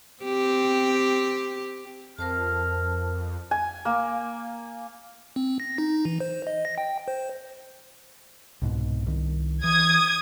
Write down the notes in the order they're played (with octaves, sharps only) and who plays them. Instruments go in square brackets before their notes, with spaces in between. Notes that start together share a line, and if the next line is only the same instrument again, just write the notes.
[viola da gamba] C4 G4
[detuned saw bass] F2 [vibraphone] A#4 C5 A5 [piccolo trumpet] F6
[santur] G#5
A#3
[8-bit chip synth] C4
A#6
D#4
E3
C5
D#5
A#6
G5
C5
[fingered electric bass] C2 G#2 B2
C2 D#3
[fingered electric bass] E3 [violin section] D#6 G#6